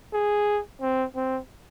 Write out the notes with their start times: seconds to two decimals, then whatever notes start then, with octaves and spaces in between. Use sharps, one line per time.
0.13 G#4
0.81 C4
1.15 C4